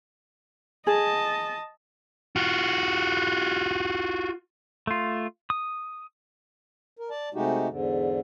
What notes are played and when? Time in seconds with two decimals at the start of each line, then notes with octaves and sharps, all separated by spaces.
0.87 G#4 D#5 A5
2.36 F4 F#4
4.87 A3 F4
5.50 D#6
6.97 A#4
7.10 D5 A5
7.34 C3 G#3 A3 D#4 F#4 G4
7.69 E2 G#2 D3